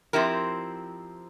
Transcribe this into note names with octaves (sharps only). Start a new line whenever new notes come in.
F3 C4 E4 G4 A#4